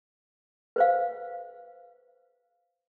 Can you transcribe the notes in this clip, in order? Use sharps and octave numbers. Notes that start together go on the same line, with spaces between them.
B4 C5 F5